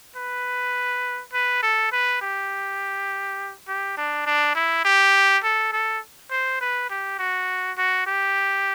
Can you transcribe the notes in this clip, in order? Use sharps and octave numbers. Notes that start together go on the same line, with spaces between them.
B4
B4
A4
B4
G4
G4
D4
D4
E4
G4
A4
A4
C5
B4
G4
F#4
F#4
G4